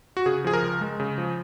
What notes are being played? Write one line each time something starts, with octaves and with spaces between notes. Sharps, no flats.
F#4
C#3 G#4
F3 G#4
A#4
C#2
G#3
C#3
F3